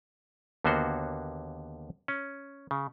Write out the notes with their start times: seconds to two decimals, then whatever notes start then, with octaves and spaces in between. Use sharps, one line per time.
0.64 D#2 D3 A#3 B3 F#4 C5
2.08 C#4
2.71 C#3